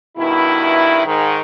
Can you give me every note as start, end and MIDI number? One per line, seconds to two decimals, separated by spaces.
0.18 1.00 43
0.18 1.00 47
0.18 1.00 51
0.18 1.00 64
1.05 1.39 44
1.05 1.39 51